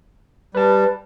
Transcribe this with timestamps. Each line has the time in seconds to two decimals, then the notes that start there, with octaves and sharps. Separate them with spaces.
0.55 G3 B4 A5